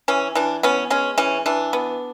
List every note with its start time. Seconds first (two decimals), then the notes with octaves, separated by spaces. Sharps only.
0.08 E3 C#4
0.35 E3 D4
0.63 B3 C#4
0.90 G#3 C#4
1.18 E3 C#4
1.46 E3 D4
1.73 B3